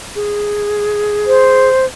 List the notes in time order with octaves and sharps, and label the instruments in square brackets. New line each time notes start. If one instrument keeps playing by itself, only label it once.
[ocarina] G#4
[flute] C5